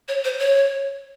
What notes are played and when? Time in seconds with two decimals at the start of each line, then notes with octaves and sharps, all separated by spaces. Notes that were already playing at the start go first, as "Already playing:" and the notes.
0.08 C#5
0.24 C5
0.39 C#5